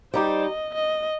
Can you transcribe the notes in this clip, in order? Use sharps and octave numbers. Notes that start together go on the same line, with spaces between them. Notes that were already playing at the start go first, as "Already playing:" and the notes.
G3 D#4 G4 C5
D#5
D#5